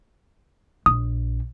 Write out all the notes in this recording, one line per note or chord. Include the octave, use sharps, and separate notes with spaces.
A#1 D#6